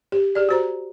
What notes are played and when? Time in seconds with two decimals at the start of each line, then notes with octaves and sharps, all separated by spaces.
0.12 G4
0.35 G4 G#4 D5
0.49 F#4 C5 A#5